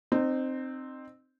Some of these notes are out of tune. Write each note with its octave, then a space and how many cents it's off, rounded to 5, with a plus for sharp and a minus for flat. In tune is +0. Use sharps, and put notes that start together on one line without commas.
C4 +0 D#4 -30